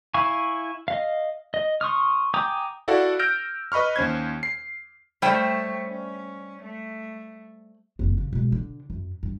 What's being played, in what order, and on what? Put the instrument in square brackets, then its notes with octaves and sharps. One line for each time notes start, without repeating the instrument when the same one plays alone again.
[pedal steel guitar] E4 F5 G#5 C#6
D#5 F5
D#5
C6 C#6 D#6 F6
G5 G#5 A#5 D6 D#6
[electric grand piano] E4 F#4 A4 D5 F5 F#5
E6 F6 G6 A#6 D7
B4 D#5 B5 C#6 F6
D#2 C#4 C5 G#6
C7
[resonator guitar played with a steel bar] G3 C5 G5 [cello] A3 C#5
[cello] C#4
A3
[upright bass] F#1 C4
C#3
B2 G#3
D3
F#2
G2